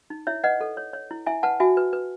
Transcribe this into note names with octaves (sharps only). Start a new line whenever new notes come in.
D#4
E4 C#5 E5
B4 D#5 F#5
A4
C#5
C#5
E4
E4 E5 G#5
B4 F#5 A5
F#4 E5 G#5
B4
B4